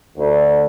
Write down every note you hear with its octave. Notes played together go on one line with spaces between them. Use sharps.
D2